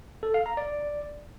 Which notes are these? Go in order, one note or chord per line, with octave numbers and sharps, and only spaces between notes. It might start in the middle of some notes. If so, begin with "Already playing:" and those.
A4
F5
A#5
D5